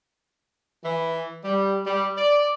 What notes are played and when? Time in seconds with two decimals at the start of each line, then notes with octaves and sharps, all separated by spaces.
0.84 E3
1.45 G3
1.87 G3
2.18 D5